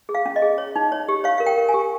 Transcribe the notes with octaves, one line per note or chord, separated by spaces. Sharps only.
G#4
F5
C#4
D#5
G#4
C#5
D#4
C#5
G4
C#5 F5
A#4 F5
G5
A#4
G#5
G4